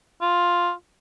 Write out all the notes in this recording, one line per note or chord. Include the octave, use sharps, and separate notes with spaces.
F4